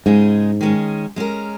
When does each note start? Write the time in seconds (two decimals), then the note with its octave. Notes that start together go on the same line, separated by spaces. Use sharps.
0.06 G#2 C#3 G#3 D#4 G#4
0.61 D#3 G#3 C#4 G#4
1.16 G#3 C#4 A#4